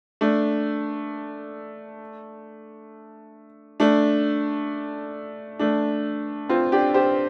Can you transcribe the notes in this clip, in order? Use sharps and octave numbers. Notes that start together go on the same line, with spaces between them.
A3 D4
A3 D4
A3 D4
C4 F4
D4 G4
G4 C5